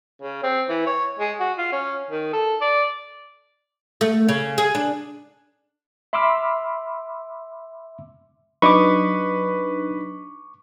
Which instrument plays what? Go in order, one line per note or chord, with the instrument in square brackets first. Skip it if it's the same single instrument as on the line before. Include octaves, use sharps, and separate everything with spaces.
[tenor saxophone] C#3
C4
E3
C#5
G#3
F#4
F4
C#4
D#3
A4
D5
[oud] A3
C#3
G#4
D4
[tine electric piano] E5 B5 C6 D6 E6 F6
[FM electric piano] F#3 D4 D#4 [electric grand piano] B4 [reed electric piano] D#5 B5 [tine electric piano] C#6 D6